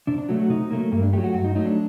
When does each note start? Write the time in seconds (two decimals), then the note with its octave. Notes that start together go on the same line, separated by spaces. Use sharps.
0.07 C3 D4
0.18 D4
0.29 F#3 A3 F#4
0.39 F#4
0.50 C3 D#4
0.71 F#3 A3 A#3
0.92 G2 A#3
1.03 D4
1.13 F#3 A3 G4
1.24 F#4
1.34 G2 F#4
1.44 D#4
1.55 F#3 A3 D#4
1.66 D4